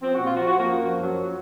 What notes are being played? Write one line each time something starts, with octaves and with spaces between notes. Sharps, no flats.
F3 C4
A#2 F#4
F4
F3 F#4
F#4
F3
A#3
F#2
F3
F#2 F#3